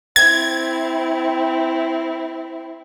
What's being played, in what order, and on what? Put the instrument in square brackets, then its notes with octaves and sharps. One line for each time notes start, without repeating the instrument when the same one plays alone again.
[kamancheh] C4 E4 [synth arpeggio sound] G#6